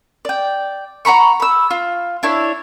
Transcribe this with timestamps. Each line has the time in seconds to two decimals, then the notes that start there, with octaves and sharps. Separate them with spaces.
0.25 D5 G5
1.05 F#5 A#5 B5 C#6
1.40 B5 E6
1.70 F4
2.23 D4 E4 C#5